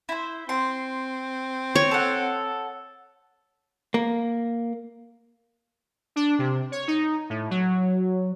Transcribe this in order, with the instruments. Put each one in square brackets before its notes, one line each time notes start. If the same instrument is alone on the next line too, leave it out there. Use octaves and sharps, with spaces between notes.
[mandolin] E4 C5
[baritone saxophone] C4 [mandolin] C6
[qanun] C#5
[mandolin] A4 F#5
[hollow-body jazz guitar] A#3
[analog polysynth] D4
C3
C#5
D#4
A2
F#3